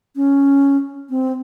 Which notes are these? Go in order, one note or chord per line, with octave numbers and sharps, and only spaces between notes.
C#4
C4